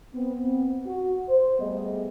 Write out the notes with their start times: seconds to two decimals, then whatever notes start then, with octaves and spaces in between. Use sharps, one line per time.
0.15 B3 C4
0.86 F#4
1.29 C5
1.60 G3 A3 B3 G#4 D#5